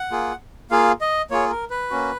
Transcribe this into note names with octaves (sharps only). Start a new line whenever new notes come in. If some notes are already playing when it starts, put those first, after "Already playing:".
Already playing: F#5
A#3 F4 G#4
A#3 F4 G#4 F5
D#5
A#3 F4 G#4 C#5
A#4
B4
A#3 C#4 F#4